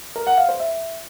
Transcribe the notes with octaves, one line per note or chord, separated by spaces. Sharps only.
A#4
F#5
F5
C5
E5